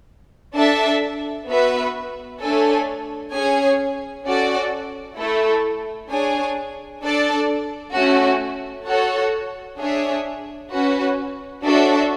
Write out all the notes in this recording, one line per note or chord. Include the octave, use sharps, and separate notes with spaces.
D4 A4 E5 A5
B3 F#4 B4 E5
A3 D4 A4 C#5 G#5
C#4 G#4 C#5 G#5
C#4 F#4 A4 D5
A3 E4 A4
D4 G#4 C#5 G#5
D4 A4 D5 A5
A3 C#4 F#4
F#4 A4 C#5 F#5
D4 G#4 C#5 E5
C#4 F#4 B4
D4 F#4 A4 C#5 E5